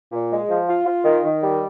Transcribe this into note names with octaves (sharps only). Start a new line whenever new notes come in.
A#2
G#3
F3
F4
F4
D#3
D#3
G3